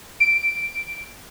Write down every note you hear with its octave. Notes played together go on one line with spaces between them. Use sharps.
D7